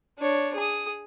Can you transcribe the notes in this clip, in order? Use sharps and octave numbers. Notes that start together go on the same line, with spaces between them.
D4 C#5
G#4 D#6